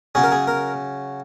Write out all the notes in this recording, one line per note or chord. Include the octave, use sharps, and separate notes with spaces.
C#3 F#3 C#4 G#4
A#4
G#4
A#4